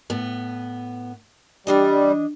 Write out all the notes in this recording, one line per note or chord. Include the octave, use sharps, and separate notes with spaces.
A2 B3
E3 G3 D4 D#5